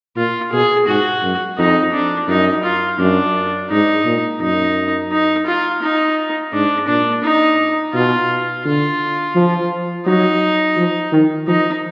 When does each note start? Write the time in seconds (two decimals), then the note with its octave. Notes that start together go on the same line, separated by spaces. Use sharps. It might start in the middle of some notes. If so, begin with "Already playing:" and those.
0.16 A#2 F4
0.52 B2 G#4
0.87 G#2 F#4
1.23 F#2
1.58 F2 D#4
1.93 D4
2.28 F#2 D#4
2.64 F4
2.99 F#2 D4
3.70 G#2 D#4
4.05 A#2
4.41 F#2 D#4
5.11 D#4
5.47 F4
5.82 D#4
6.53 G#2 D4
6.87 A#2 D4
7.23 D#4
7.93 B2 F4
8.65 D3 F4
9.35 F3
10.06 F#3 D#4
10.76 F3
11.12 D#3
11.47 F3 D#4